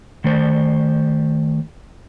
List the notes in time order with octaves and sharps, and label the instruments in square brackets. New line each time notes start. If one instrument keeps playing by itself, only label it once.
[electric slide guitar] D#3 A3 C5